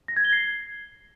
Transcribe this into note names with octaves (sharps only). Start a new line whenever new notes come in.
A#6
G#6
G7
C7